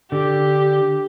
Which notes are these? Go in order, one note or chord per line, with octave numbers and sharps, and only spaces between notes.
D3 G4